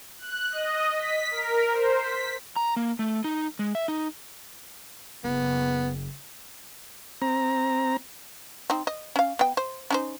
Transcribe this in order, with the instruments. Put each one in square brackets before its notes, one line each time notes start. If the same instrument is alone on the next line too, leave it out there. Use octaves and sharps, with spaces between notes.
[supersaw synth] F#6
D#5
B6
A#4
C5
B6
[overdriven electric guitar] A#5
A#3
A3
D#4
G#3
E5
D#4
[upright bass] F#1 [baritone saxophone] B3
[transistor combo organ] C4 A#5
[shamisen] C4 D#4
D#5
C#4 F5
B3 G5
C5
C#4 D#4 C5